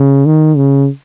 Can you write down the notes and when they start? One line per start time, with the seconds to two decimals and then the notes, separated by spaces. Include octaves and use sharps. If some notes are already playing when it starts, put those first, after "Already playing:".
Already playing: C#3
0.26 D#3
0.57 C#3